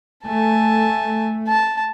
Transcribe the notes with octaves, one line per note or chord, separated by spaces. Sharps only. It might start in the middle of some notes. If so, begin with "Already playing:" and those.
A3 G#5 A5
A5